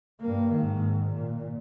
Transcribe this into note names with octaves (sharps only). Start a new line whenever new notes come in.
G2 A#3
G#2 D#3
A#2